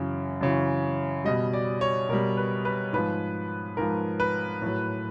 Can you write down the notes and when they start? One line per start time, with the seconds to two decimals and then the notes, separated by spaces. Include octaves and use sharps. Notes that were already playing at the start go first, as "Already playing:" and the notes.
Already playing: F#2 C#3 E3
0.41 F#2 C#3 E3
1.25 B2 G3 D#5
1.53 D5
1.81 C#5
2.09 B2 G3 A#4
2.37 B4
2.65 B4
2.93 G#2 F3 B4
3.77 G#2 F3 A#4
4.20 B4
4.62 A2 F#3